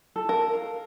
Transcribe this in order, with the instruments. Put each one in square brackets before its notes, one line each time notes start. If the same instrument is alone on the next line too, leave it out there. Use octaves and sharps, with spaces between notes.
[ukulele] A4
[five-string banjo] A#4
[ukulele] F5